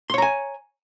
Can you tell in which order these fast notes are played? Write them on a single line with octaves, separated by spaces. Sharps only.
C6 C#5 A#5 G#5